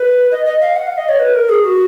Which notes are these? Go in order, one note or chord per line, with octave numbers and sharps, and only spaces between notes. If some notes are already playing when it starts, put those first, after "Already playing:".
Already playing: B4
D#5
D#5
F5
F#5
F5
D#5
C#5
B4
A#4
G#4
F#4